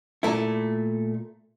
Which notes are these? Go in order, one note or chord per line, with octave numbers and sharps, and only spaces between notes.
A#2 A3 E4